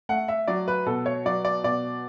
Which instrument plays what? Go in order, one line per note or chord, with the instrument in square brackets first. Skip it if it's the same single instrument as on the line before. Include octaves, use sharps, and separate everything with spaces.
[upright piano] A3 F#5
E5
F#3 D5
B4
B2 A4
C#5
F#3 D5
D5
B2 D5